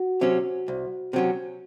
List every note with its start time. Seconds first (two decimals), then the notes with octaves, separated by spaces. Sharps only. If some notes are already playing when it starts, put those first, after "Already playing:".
Already playing: F#4
0.21 C3 F#3 C#4
0.68 C2
1.13 C3 F#3 C#4